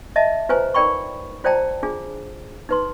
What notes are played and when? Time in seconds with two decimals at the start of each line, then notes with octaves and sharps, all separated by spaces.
0.16 D#5 E5 A5
0.49 F4 B4 C5 G#5 A#5
0.74 D#4 A#4 D5 G5 B5 C#6
1.44 F4 C5 D5 G5 A5 A#5
1.83 D4 F4 G#4
2.69 D#4 B4 C6